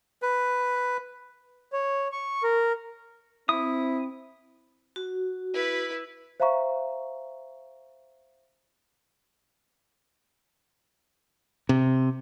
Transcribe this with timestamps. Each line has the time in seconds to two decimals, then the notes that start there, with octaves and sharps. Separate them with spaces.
0.22 B4
1.73 C#5
2.12 C#6
2.43 A#4
3.49 C4 E4 D#6
4.96 F#4
5.54 E4 B4
6.40 C5 E5 F5 A#5 C#6
11.69 C3